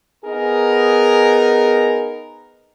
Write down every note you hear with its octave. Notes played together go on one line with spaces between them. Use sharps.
B3 D#4 G#4 A#4